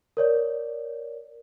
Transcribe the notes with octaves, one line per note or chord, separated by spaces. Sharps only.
A#4 C#5 D5